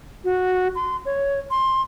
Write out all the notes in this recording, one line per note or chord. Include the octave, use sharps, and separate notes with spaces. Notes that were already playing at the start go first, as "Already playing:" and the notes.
F#4
C6
C#5
C6